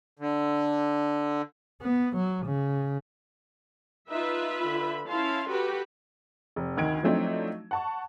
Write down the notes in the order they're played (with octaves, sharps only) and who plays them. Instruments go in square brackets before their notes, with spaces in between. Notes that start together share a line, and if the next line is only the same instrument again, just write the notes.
[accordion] D3
[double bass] B3
F#3
C#3
[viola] D#4 [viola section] F4 B4 E5
[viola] D3 B5
[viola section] C#4 E4 F5 [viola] A5 C6
[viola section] F#4 G4 B4 [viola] A4
[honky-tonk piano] F1
D2 D#3 G#6 D7
F3 F#3 A3 C4 D4 D#4
F#5 A5 C#6